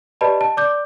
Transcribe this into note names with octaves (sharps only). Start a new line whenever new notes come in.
G4 B4 D5 D#5 A5 B5
A5
D5 D6 G6